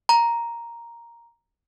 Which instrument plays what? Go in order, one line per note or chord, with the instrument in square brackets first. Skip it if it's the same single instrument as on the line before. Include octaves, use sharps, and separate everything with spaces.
[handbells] A#5